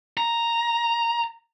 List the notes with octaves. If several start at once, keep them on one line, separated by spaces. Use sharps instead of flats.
A#5